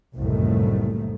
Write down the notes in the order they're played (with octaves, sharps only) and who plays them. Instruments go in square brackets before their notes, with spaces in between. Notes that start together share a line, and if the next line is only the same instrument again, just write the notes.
[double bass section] F#1 C2 F2 A2 D#3 A3